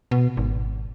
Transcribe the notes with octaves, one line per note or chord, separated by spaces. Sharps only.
B2
G#1